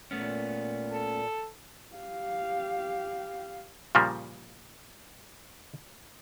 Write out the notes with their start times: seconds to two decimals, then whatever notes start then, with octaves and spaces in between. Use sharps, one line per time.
0.11 A#2 A3 B3 C#4
0.92 A4
1.95 G4 F5
3.95 A#2 C#3 F3 G3 A#3